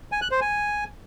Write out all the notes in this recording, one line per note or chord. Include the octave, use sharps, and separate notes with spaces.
G#5
F#6
C5
G#5